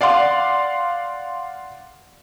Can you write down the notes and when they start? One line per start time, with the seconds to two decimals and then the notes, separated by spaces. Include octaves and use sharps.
0.01 D5 F5 F#5 C6